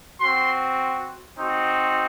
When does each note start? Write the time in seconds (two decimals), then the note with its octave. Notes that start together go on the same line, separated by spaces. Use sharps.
0.20 C4 F#4 C6
1.37 C4 D#4 F#4